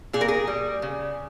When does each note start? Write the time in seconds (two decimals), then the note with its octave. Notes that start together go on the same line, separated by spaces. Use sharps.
0.13 A#2 G#4
0.21 A#4
0.28 G#4
0.47 G3
0.82 C#3